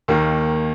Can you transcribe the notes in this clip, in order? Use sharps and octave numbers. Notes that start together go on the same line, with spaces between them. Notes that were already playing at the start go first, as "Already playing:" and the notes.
D#2 D#3 A#3